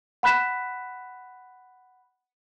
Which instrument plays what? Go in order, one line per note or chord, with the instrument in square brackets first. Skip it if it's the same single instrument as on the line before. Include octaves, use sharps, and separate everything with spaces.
[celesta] F#5 B5 F#6 B6 E7